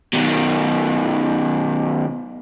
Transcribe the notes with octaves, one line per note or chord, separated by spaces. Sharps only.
B2 D#3